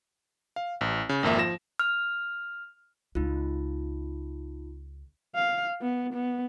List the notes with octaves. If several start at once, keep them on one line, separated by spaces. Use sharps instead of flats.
F5
A1
C#3
G#1 F2 A#3 E5
F3 A#6 E7
F6
C#2 D#4 F4
F5
B3
B3